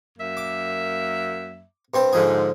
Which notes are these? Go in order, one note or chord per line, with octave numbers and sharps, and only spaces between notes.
F#2 A#3 E5
D6
G2 C4 C5
G#2 D3 F3 G#4